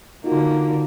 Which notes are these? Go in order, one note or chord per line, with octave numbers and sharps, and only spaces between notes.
D3 A#3 D#4 F4 F#4